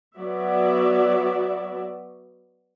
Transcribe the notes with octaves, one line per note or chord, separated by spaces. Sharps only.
F#3 B3 F#4 D5 E5